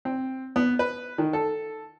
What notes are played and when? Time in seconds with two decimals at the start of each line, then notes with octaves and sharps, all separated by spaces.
0.05 C4
0.56 B3
0.79 B4
1.18 D#3
1.33 A4